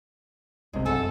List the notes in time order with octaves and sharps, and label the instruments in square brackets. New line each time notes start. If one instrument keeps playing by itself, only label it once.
[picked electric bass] E1 B1 C3 [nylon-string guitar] G#3
[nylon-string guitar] F#2 F#5 G#5 [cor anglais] A4